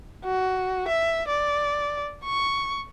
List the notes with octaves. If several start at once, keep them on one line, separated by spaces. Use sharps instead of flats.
F#4
E5
D5
C#6